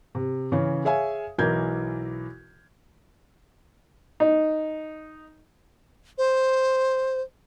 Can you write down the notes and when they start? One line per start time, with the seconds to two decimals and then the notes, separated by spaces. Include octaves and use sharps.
0.15 C3
0.52 C#3 E3 C#4
0.85 G#4 C#5 E5 F5 G#5
1.38 B1 E3 E4 A#4 G6 G#6
4.20 D#4
6.18 C5